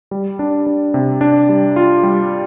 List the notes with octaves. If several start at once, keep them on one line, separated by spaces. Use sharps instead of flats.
G3
D4
D4
C3
D4
G3
F4
G3